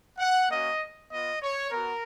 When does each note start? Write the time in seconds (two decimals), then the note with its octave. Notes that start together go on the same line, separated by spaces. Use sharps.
0.19 F#5
0.50 A#3 C#4 F#4 D#5
1.11 B3 F4 D#5
1.41 C#5
1.71 B3 F#4 A#4